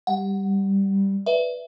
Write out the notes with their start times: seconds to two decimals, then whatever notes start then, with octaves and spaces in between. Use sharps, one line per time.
0.07 G3 F#5
1.26 B4 D5 E5